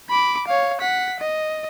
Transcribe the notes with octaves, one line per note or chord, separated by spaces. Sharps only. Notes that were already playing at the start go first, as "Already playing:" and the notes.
B5 D6
C#5 F5
F#5 B6
D#5